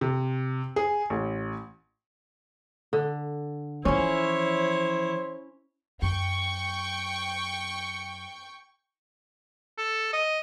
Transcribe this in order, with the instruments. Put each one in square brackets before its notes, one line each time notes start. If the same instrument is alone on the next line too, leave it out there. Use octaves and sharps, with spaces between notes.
[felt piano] C3
G#4
A1
[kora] D3
[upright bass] E3 F3 [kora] C#4 [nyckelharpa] E4 C#5 [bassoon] C5
[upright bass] F#2 [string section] G5 C#6
[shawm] A4
D#5